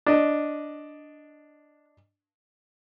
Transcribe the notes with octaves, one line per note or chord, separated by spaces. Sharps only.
D4 D#5